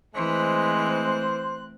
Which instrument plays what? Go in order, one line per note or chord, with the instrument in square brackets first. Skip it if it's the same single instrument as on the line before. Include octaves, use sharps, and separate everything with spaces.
[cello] E3 [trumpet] G#3 [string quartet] A3 C4 F#6 [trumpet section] C5 C6